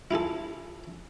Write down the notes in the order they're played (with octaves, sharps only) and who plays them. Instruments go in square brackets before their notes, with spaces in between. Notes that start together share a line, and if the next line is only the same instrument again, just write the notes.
[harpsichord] E4 F4 G#4 A4